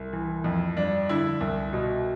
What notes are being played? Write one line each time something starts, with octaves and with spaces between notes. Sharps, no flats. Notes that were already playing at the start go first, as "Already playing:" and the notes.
Already playing: C2
E3
F2
G2 D4
D3 E4
C2
B2